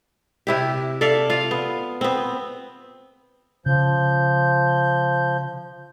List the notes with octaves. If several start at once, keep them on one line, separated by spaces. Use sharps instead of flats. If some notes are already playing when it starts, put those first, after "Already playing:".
C3 E4 G4
A4 D5 E5 F5
F4 F5
B3
B3 C4
C#3 F3 G6